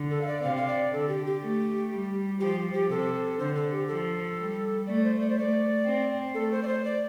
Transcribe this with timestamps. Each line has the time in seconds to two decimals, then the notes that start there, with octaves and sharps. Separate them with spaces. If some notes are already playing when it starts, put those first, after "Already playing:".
Already playing: D3
0.11 A4
0.21 F5
0.27 D5
0.43 C3 F5
0.56 F5
0.68 D5
0.93 D3 A4
1.09 G4
1.26 G4
1.41 A3
1.91 G3
2.40 F3 G4
2.74 G4
2.89 C3 A4
3.39 D3 C5
3.55 A4
3.71 G4
3.88 F3 A4
4.37 G3
4.87 A3 D5
5.04 C5
5.20 D5
5.30 C5
5.36 A3 D5
5.86 C4
6.34 A3 A4
6.51 C5
6.63 D5
6.67 C5
6.84 D5